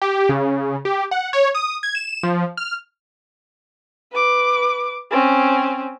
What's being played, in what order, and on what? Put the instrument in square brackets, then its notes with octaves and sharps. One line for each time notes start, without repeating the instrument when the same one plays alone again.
[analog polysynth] G4
C#3
G4
F#5
C#5
D#6
G#6
E7
F3
F6
[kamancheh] B4 D6
C4 C#4